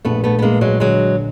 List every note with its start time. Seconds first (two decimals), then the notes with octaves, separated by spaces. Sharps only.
0.05 A#1 A3 B3
0.24 A3 B3
0.39 B3
0.42 A#1 G#3 A#3
0.61 F#3 G#3
0.80 D3 F#3 G#3